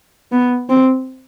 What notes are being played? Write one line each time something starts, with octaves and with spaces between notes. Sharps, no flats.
B3
C4